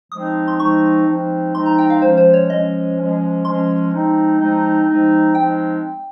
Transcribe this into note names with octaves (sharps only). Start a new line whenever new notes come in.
F3 G#3 C4 D#4 D#6
C6
F3 G#3 C4 D#4 C#6
F3 G#3 C4 D#4
F3 G#3 C4 D#4 C6
A#5
G5
F5
F3 G#3 C#4 C5
C5
C#5
F3 G#3 C#4 D#5
F3 G#3 C#4
F3 G#3 C#4 C6
F3 G#3 C4 D#4
F3 G#3 C4 D#4
F3 G#3 C4 D#4
F3 G#3 C4 D#4 G5